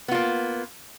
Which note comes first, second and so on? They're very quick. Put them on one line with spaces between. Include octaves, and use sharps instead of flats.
B3 F4 A#3